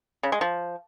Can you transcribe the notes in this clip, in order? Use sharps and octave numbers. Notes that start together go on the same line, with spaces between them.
C#3
G#3
F3